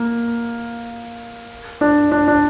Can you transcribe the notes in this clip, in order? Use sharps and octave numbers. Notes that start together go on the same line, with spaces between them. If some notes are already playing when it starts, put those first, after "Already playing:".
Already playing: A#3
D4
D4
D4